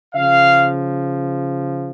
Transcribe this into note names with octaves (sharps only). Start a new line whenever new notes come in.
C#3 F3 F5